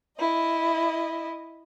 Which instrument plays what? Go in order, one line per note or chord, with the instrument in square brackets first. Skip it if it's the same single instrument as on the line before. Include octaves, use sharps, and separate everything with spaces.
[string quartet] E4 D#5